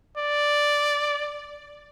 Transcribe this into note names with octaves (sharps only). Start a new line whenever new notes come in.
D5